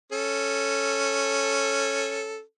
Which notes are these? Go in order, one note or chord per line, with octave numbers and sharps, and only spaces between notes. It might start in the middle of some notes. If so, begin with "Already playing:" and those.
C#4 A4